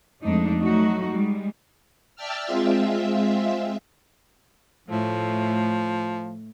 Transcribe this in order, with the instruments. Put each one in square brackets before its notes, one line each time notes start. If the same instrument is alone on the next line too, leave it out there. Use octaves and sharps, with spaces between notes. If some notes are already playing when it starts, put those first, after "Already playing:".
[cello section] F2 G#3 A3 D4 D#4
F#3 A3 D#4 F#4
G3 G#3
[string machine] D5 E5 G5 A5 E6 F6
G#3 C4 F4 E5
[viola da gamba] A2 A3 [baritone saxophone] F3